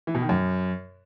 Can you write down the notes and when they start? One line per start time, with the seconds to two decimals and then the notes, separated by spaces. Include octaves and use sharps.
0.07 E3
0.15 B2
0.22 D#3
0.29 F#2